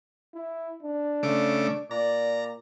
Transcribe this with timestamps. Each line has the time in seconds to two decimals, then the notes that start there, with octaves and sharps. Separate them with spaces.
0.34 E4
0.83 D4
1.23 C#3 A3 D6
1.91 A#2 D5 A#5